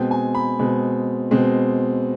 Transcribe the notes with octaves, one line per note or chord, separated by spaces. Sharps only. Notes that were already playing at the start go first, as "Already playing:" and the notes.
Already playing: B2 G#3 C4 G5
G#5
B5
B2 G#3 C4
B2 G#3 C4